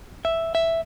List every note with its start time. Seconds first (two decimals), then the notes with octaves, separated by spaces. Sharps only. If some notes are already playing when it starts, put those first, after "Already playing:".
0.25 E5
0.55 E5